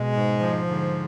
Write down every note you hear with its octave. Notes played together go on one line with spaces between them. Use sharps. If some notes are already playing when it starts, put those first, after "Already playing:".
Already playing: B2 G#3
G#2
F3
G#2 D3